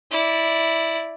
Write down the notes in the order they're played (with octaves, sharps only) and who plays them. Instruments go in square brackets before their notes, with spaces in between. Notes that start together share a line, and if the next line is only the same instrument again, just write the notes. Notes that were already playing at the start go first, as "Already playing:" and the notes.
[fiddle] E4 D5